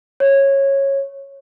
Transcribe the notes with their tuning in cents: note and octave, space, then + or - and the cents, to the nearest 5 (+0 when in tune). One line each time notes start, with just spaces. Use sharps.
C#5 -15